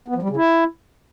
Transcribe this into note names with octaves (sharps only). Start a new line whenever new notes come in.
B3
F3
G3
C#3
E4